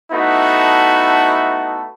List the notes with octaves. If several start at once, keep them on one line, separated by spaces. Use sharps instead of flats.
A3 B3 D#4 E4 F#4 A4